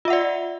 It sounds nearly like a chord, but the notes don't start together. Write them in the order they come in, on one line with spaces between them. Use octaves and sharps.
F4 E5 F#5 D5